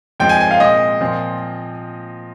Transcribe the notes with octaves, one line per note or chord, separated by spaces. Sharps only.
G#2 F3 G#3 C4 G5
G#5
G#5
F5
A#2 G#3 C4 D#5
A#2 F3 C4